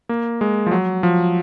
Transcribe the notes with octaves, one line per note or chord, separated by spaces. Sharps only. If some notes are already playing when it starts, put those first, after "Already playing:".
A#3
G#3
F3
F#3
F3